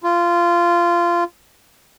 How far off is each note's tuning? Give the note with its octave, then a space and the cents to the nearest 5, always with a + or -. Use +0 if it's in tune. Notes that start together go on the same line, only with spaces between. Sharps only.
F4 -15